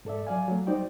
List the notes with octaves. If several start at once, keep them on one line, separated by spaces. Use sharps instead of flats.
G#2 A4 D5 E5
F#3 D5 F5 G#5
F#3 A3
G3 D#4 F#4 C5 D5 G5